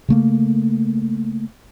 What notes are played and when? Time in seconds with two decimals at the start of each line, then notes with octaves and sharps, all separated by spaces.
0.09 C#3 A3 A#3